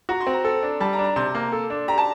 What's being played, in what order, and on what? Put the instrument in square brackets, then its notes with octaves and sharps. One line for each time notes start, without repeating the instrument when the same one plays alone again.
[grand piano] F#4 [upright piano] A#5
[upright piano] C6
[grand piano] C4
[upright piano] A#5
[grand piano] A4
D4
[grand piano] G3 [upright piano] A5
[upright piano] A#5
[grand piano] D4
[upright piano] A#5
[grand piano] C3 [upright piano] C6
[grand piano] A#3
A4
D4
[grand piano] G4 [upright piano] A#5
[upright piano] A5